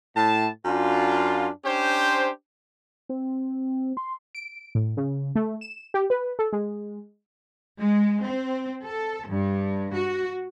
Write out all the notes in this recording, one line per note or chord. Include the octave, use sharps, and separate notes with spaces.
A2 A5
F#2 D4 F4
C#4 D4 G4 C5
C4
C6
D7
A2
C#3
A3
E7
G4
B4
A4
G#3
G#3
C4
A4
G2
F#4